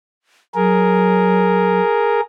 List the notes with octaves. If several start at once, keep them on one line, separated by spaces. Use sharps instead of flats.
F#3 G#4 A#4